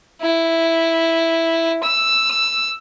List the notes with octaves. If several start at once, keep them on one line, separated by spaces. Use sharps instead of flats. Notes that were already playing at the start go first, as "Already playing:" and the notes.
E4
E6